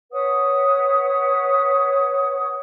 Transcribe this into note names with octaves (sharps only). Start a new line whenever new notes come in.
B4 C#5 F#5 D#6